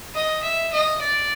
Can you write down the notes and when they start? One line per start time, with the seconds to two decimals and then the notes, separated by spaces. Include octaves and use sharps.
0.15 D#5
0.43 E5
0.73 D#5
1.01 D5